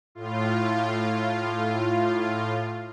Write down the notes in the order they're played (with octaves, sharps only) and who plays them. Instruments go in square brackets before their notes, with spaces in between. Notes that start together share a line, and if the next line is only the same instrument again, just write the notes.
[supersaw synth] A2 F4